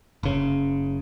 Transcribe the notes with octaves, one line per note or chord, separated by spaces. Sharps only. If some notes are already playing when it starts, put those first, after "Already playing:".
F#1 C#3